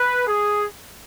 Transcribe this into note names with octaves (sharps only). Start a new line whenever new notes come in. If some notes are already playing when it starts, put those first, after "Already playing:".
Already playing: B4
G#4